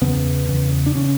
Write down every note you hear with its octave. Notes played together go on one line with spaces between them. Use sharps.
E2 C#3 B3
E2 C#3
D4
C#3 C#4